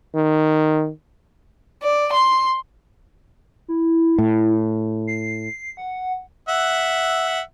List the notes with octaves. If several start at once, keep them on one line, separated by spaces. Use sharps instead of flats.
D#3
D5
C6
E4
A2
C7
F#5
E5 F#5